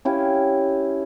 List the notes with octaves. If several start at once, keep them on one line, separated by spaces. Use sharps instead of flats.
C#4 E4 G4 F5